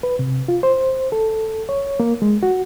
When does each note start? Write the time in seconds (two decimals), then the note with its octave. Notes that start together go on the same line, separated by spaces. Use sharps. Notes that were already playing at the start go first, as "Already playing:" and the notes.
0.03 B4
0.19 C3
0.48 F4
0.63 C5
1.12 A4
1.69 C#5
2.00 A#3
2.22 G#3
2.43 F#4